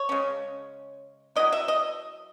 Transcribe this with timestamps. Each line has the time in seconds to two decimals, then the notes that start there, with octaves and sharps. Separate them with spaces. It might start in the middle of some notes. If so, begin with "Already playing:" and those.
Already playing: C#5
0.09 C#3 G#3 C#4
1.36 F#3 C#4 E4 D#5
1.52 E5
1.68 D#5